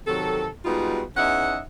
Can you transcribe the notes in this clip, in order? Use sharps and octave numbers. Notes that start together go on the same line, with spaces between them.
C3 D#3 F#3 A4
G3 G#3 B3 D#4 F4 F#4
E2 C#4 D#4 E5 F#5